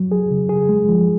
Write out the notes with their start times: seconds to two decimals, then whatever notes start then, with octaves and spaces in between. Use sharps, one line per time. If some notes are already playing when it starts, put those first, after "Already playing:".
Already playing: F#3
0.12 G#4
0.31 C#3
0.49 G#4
0.69 G#3
0.89 F3